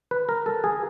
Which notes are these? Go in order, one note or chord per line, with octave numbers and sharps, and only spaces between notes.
B4
A#4
A4
G#4